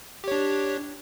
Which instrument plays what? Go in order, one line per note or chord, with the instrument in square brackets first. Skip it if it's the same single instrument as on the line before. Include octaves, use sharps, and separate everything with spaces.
[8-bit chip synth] G4
C#5
D4